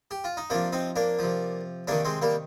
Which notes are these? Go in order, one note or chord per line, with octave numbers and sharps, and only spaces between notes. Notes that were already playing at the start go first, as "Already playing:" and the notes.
G4
F4
D#4
C3 F3 A#3 D4
C4 D#4
A#3 D4
C3 F3
C3 D#3 A#3 D4
G#3 C4
G3 A#3